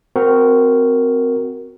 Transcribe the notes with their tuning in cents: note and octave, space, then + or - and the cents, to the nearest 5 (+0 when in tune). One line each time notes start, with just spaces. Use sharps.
C4 -15 F#4 +0 A#4 -5